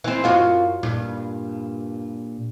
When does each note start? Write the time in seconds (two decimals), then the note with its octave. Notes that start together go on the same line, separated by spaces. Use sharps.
0.04 E3 C4
0.24 F#2 F4 F#4
0.83 G2 A#2